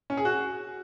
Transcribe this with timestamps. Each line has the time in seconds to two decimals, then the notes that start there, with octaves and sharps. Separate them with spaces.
0.10 C#4
0.17 G#4
0.25 F#4